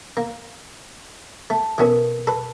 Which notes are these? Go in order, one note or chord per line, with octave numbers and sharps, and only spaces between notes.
A#3
A3 A5
B2 E3 B3 C#4 A4 A#4
A4 B4